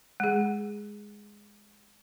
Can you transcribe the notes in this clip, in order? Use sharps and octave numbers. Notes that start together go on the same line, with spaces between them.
G#3 G#4